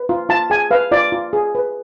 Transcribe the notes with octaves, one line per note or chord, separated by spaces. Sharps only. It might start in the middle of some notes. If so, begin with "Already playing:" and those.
Already playing: B4
F4
F4 A5
G#4 G#5
B4 F5
F4 D5
F4
G#4
B4